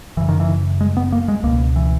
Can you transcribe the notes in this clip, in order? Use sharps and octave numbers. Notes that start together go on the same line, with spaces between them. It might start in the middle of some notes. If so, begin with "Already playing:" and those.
F#1 F#2 C#3 E3
D#3
E3
G#3
B3
A#3
G#3
C#2 B2 A#3
E3